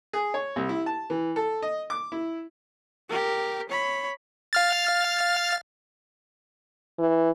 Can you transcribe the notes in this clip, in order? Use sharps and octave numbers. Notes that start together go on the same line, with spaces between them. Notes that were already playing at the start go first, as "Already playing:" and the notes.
G#4
C#5
C2
E4
A5
E3
A4
D#5
D6
E4
G4 A#4
C#5 B5
F5 F6 A6
E3